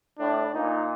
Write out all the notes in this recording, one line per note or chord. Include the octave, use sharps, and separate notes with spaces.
A2 D4
A#2 D#4